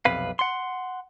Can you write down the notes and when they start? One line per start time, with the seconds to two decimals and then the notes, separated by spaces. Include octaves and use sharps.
0.05 B1 F2 C3 B4 F5
0.39 F#5 C6